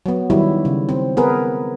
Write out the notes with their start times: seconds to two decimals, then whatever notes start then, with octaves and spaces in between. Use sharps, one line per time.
0.06 F#3 B3
0.30 D#3 F#3 G3 E4
0.65 C#3
0.89 C4
1.17 B3 G#4 A#4 B4